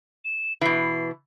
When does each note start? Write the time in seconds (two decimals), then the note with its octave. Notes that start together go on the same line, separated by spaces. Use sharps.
0.24 E7
0.61 B2 E3 C7